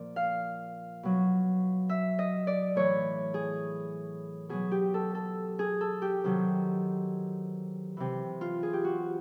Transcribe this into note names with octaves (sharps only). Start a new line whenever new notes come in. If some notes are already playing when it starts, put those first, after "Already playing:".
Already playing: A#2 F3 D5
F5
B2 F#3
E5
D#5
D5
A2 E3 C#5
G#4
B2 F#3 G#4
G4
A4
A4
G#4
A4
G4
C3 D#3 F#3
C3 E3
F4
G#4
G4
F#4